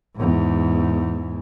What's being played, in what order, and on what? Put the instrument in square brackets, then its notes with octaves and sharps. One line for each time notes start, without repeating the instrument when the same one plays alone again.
[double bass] E2 G#2